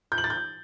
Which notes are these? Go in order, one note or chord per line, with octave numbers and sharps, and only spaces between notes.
G6
F#7
A6
G6